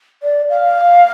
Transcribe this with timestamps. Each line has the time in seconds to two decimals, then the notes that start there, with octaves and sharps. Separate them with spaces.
0.23 D5
0.50 F5